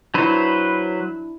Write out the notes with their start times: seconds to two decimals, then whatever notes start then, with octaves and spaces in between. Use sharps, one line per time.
0.14 F#3 D4 E4 B4 C5